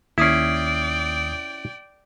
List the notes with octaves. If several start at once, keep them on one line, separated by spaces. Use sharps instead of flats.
D#2 C#4 E4 D5 G5 D#6 C7